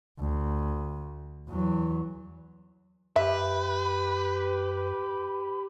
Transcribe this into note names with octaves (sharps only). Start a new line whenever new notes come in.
D2
E2 F#3
F#2 G4 B4 E5